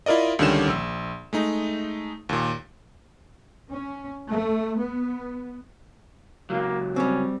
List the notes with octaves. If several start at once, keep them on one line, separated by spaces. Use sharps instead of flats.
E4 F4 A#4 D5 D#5
C#2 D3 D#3 G3 C#4 E7
A#1 E6
G#3 A3 D#4
D#2 A#2
C#4
A3
B3
C#2 F#3 A#3
G3 C4 C#4